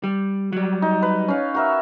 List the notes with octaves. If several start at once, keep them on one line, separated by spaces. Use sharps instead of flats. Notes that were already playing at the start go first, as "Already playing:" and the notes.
G3
F#3 G3
D#4
B4
C#4 F5
F#4 A#4 E5